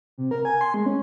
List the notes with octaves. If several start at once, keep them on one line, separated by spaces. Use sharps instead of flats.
C3
A#4
G#5
C6
G#3
C#4